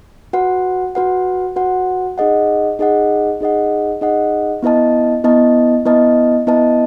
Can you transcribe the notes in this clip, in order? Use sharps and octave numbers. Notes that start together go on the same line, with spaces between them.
F#4 B4 F#5
F#4 B4 F#5
F#4 B4 F#5
D#4 G#4 D#5 F#5
D#4 G#4 D#5 F#5
D#4 G#4 D#5 F#5
D#4 G#4 D#5 F#5
B3 E4 B4 D#5 A5
B3 E4 B4 D#5 A5
B3 E4 B4 D#5 A5
B3 E4 B4 D#5 A5